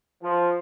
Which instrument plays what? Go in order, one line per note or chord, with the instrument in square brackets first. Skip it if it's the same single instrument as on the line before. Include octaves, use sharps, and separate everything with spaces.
[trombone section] F3